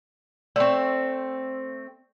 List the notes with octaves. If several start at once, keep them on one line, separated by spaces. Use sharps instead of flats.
A3 C4 D5 C6 C#6